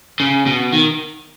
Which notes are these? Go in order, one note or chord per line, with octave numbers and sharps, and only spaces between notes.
C#3
B2
D#3